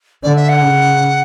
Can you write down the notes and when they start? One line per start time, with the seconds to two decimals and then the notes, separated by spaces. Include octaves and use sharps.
0.23 D3 D5
0.36 E5
0.49 F#5
0.62 C#3